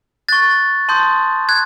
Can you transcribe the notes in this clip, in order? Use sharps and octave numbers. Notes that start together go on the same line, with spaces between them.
C#6 F#6 A6
A5 C6 D#6 G6
F#6 G#6